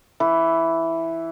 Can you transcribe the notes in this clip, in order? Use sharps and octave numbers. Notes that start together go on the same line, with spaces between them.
E3